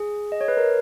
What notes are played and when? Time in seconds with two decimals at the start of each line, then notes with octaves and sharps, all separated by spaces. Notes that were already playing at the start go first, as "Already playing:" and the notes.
Already playing: G#4
0.32 D#5
0.41 C#5
0.48 B4
0.57 A#4